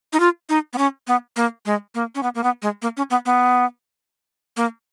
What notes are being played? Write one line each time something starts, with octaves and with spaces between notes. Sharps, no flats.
D#4
F4
D#4
B3
C#4
B3
A#3
G#3
A#3
C#4
B3
A#3
B3
G#3
A#3
C#4
B3
B3
A#3